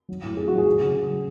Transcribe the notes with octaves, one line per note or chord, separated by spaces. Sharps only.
F#3
A2
A2 G#4
F#3 F#4
G#4
F#3
C#3
C#3
F#3